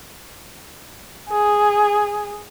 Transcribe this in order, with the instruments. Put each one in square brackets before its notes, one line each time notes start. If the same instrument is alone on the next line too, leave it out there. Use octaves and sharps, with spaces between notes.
[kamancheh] G#4